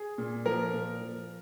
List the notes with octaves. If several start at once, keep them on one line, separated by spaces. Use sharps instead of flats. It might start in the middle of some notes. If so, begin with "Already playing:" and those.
Already playing: G#4
A#2
F3 A#4
A#2
F3